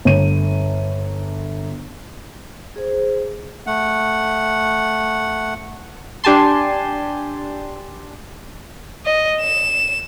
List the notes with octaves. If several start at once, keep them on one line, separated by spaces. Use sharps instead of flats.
G1 D#7
G#4 C5
A3 F#5
D4 G4 G#5 A5 C6
D#5
E7